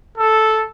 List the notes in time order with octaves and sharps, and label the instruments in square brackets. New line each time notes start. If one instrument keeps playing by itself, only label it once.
[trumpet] A4